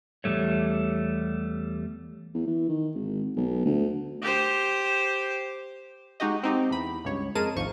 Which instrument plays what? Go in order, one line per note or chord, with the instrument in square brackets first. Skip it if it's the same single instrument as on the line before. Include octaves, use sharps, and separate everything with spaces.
[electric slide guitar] E2 E3 G3 A3 C#5
[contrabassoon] E2
E3
D#3
G#1
B1
D2
[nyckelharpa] G4 C5
[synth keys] G#3 D#4 F#4 G4 D#5
C4 D#4 G4
E2 B5
C#2 G2 C#5
F2 G#3 G#4 A#4 A5 D#7
G#1 D2 G#2 F3 C#6